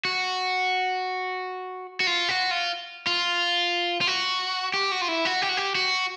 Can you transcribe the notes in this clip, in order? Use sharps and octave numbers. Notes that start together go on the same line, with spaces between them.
F#4
F#4
F4
F#4
F4
F4
F4
F#4
G4
F#4
F4
E4
F#4
G4
F#4
G4
F#4